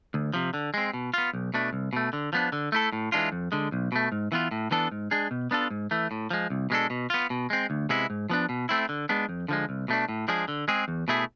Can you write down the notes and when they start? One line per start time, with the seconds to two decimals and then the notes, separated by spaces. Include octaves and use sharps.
0.14 D2
0.34 C3 F3
0.54 D3
0.74 G#3 C4
0.93 B2
1.14 B3 F4
1.33 B1
1.54 B2 A3 D4
1.73 C2
1.93 B2 A3
2.13 D3
2.33 F3 B3 D4
2.52 D3
2.72 A3 E4 A4
2.92 A2
3.12 E3 G#3 D4 F4
3.32 F2
3.52 D3 G#3
3.72 B1
3.92 B2 A3
4.12 G#2
4.32 E3 B3 F4
4.51 A2
4.71 E3 B3 D4 A4
4.91 G#2
5.11 G#3 D4 G#4
5.31 B2
5.51 B3 D4 F4 A4
5.70 G#2
5.91 E3 A3
6.11 A2
6.30 F3 G#3
6.50 C2
6.70 B2 G#3 D4 A4
6.90 B2
7.10 B3 F4
7.30 B2
7.50 G#3 C4
7.70 D2
7.89 C3 G#3 B3 E4
8.10 G#2
8.30 F3 B3 D4
8.49 B2
8.69 A3 C4 E4
8.89 D3
9.09 G#3 B3 D4
9.29 F2
9.48 D3 F3 G#3
9.69 C2
9.88 B2 A3 D4
10.09 A2
10.28 F3 G#3 D4 G#4
10.48 D3
10.68 G#3 C4 G#4
10.88 E2
11.08 B2 A3 E4 G#4